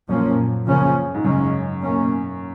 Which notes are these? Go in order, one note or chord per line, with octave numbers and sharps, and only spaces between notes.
F#2 A#2 F3 A#3 C#4
C#3 F3 A#3 C#4
G#2
F#2 C#3 G#3 C#4
B2 A#3 C#4